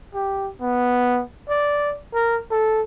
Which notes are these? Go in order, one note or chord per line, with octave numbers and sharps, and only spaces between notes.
G4
B3
D5
A#4
A4